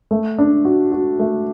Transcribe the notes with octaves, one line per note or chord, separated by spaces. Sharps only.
A3
D4
F#4
F#4
A3